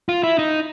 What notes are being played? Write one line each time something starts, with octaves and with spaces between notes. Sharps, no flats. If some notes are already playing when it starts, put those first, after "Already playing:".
F4
E4
D#4